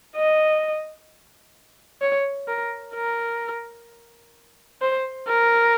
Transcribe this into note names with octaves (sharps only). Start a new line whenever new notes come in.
D#5
C#5
A#4
A#4
C5
A#4